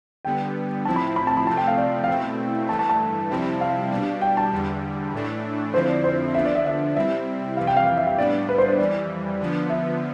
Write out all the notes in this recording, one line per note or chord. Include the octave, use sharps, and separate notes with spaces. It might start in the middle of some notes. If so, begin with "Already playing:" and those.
D3 G3 B3 G5
A2 F3 C4 E4 A5
B5
B5
A5
B5
C3 F3 A3 C4 A5
G5
F5
D5
F5
B2 A3 C4 E4 G5
G2 E3 A3 A5
A5
A5
F2 C3 G3 C4 E4
F5
B2 G3 D4
G5
A5
E2 D3 G3
A2 E3 A3 D4
F2 D3 F3 C4 E4 C5
D5
C5
D3 F3 B3 D4 E5
D5
E5
E5
C3 G3 C4 E4 E5
F2 C3 E3 G3 F5
G5
F5
F5
E5
F5
A2 G3 B3 D4 D5
B4
C5
C5
F2 E3 G3 D5
D3 F3 B3
E5